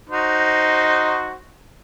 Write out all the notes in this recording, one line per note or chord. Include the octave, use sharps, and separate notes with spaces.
D#4 F#4 C5